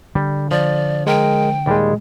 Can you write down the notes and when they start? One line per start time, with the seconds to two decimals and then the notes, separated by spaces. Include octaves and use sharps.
0.15 D3 G3
0.51 F3 D5
1.07 G#3 A#4 G5
1.66 D#2 A#2 G3 G#3